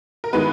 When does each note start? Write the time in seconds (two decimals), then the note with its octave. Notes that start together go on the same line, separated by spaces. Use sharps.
0.24 A#4
0.33 D#3 G#3 B3 B4